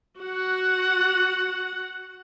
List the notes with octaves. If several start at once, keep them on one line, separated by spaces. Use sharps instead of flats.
F#4 F#5